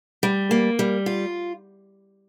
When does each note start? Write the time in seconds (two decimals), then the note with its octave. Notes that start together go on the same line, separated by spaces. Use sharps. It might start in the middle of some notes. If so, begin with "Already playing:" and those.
0.23 G3
0.51 A#3
0.79 G3
1.06 F4